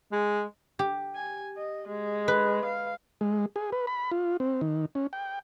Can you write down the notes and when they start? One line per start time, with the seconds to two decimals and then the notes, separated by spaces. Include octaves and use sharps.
0.13 G#3
0.79 G4
1.16 G#5
1.57 D#5
1.88 G#3
2.28 B4
2.65 F5
3.21 G#3
3.56 G#4
3.72 B4
3.87 B5
4.12 F4
4.40 C4
4.61 D#3
4.95 C#4
5.13 G5